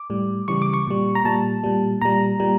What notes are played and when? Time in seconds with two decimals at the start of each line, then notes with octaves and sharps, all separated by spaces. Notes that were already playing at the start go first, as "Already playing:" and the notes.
Already playing: D6
0.10 A2 G3
0.48 C#3 E3 G3 C#6
0.62 D6
0.74 C#6
0.87 A#2 G3
1.15 A#5
1.24 A#2 G3 A5
1.64 A#2 G3
2.01 A#2 G3 A#5
2.40 A#2 G3